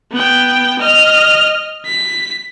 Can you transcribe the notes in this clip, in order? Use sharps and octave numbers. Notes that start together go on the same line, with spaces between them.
B3 G5
D#5 F6
B6